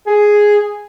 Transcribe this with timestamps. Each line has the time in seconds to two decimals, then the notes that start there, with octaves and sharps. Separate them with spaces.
0.07 G#4